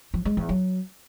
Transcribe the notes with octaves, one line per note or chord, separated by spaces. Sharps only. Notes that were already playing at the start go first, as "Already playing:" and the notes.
F3
G#3
E2
F#3